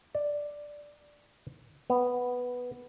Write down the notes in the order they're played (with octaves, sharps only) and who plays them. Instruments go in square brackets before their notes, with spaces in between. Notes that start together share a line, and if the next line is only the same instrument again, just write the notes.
[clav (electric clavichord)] D5
B3